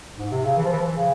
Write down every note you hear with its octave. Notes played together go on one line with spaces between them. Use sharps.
G#2
C3
C#3
E3
F3
E3
F3
E3
C#3